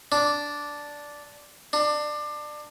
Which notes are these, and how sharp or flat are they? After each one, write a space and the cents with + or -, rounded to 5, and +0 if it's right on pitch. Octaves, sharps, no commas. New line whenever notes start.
D4 -5
D4 +25